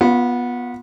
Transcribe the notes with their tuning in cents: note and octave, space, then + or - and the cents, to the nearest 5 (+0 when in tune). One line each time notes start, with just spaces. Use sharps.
B3 -15 F4 +20